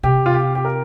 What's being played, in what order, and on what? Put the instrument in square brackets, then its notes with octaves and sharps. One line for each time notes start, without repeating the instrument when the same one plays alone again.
[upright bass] C3 [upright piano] G4
[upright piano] F4
G4
G4
A#4